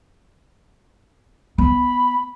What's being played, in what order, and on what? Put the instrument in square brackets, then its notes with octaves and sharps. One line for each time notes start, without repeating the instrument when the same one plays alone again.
[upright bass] B3 [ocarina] B5